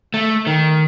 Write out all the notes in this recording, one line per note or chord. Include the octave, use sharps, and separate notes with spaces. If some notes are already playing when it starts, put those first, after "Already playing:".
A3
D#3